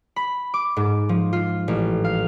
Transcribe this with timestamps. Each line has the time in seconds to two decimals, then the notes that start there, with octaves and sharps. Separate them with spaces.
0.16 B5
0.54 D6
0.76 G#2
1.09 F3
1.33 F4
1.68 A1
2.04 F5